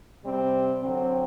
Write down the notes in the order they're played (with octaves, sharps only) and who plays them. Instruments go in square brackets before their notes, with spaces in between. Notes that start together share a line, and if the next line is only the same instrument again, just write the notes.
[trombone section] C3 G3 C4
D3 F#3 C4